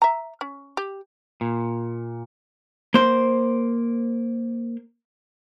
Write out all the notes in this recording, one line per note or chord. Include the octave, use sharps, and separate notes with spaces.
E5 A#5
C#4
G4
A#2
A#3 C5